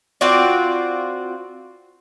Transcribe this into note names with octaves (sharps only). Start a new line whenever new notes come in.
C4 F4 F#4 D5